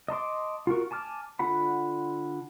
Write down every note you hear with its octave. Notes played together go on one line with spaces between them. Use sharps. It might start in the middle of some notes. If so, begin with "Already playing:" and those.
D#5 A5 C6 D6
F4 F#4 A#4 C#6
G#5 A5 D6 F6
D3 F4 F#5 B5